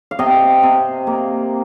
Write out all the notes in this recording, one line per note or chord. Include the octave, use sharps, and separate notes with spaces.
F5
C3 D#5 G5
C3
A#3